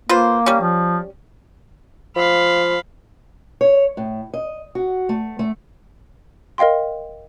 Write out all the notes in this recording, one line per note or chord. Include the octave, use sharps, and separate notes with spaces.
A#3 F4 B4 C5
G3 C#4
F3
F3 F5 B5
C#5
A2
D#5
F#4
A3
A3
A#4 D#5 F5 G5 C6